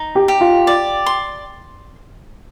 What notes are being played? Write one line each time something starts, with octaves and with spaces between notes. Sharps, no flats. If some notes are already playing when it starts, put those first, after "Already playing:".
Already playing: D#4
G4
G4
F4
D5
C6